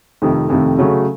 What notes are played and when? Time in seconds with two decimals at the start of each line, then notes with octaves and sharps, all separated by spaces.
0.22 F2 C3 D#3 A3
0.50 F2 C3 D#3 A3
0.79 C#3 F#3 A3